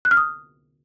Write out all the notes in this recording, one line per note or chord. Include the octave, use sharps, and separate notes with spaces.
F#6
F6
D#6